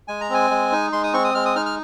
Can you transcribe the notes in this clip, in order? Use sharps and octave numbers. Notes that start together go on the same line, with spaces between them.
G#3 G#5
A#5
C4 G#5
G#3
D#4
G#3 C6
D#6
C4 C#6
D#6
G#3 F6
D#6
D#4 F6
F6